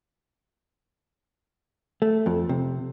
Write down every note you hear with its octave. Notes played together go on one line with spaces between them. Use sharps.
A3
F2
C3